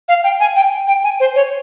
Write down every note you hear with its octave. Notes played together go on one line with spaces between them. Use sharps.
F5
G5
G#5
G5
G5
G#5
C5
C#5